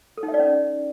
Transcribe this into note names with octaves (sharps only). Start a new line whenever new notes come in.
A4
D#4
E5
D5
C#4